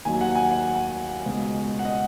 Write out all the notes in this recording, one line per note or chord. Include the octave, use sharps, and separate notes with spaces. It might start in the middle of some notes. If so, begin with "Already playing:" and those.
D#2 D#3 F#3 G#5
F#5
G#5
F#5
C#2 B2 G#3
F#5
D#5